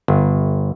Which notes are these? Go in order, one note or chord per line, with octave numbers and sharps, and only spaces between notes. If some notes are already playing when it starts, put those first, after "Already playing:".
G1